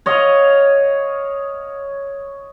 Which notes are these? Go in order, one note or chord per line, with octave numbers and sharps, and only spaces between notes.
C#5 D#5 F5